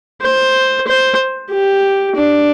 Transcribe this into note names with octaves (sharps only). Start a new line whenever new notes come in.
C5
C5
G4
D4